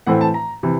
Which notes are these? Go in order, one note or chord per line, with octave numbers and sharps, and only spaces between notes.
A2 E3 A3 C4 F#5
A5
A#5
C3 E3